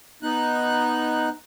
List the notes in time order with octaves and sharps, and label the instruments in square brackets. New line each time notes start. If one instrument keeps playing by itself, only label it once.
[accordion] B3 D#4 F#6